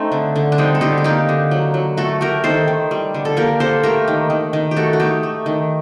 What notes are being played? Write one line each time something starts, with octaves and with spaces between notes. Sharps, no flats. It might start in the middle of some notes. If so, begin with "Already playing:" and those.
Already playing: A3 C4 D#4
D3
D3
D4
G3 C4 D#4
A4
D3 D#4 G4
A4
A#3 D#4 G4
D3
F#3
F#3
A3 F#4 A4
A3 G4 A#4
D#3 A4 C5
D#3
G3
D3
A4
A#3 G4 A#4
A#3 A4 C5
A3 G4 A#4
D#3
D#3
D#3
G4
A3 F#4 A4
F#4
A3 D#4 G4
A3
D#3